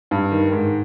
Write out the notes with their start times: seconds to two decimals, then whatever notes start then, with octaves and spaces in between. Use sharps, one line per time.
0.11 G2
0.32 D#3
0.52 G#2